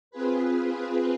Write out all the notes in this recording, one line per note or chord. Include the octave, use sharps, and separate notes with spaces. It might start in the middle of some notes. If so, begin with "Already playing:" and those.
C4 F4 G#4 B4